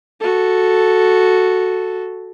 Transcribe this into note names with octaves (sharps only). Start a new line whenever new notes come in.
F#4 A4